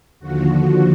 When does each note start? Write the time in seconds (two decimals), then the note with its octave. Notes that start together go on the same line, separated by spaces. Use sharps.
0.19 D#2 D3 F3 F#4